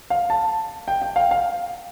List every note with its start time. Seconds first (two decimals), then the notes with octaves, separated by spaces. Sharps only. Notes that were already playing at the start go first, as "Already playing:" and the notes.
0.10 F5
0.30 A5
0.88 G5
1.02 G5
1.16 F5
1.31 F5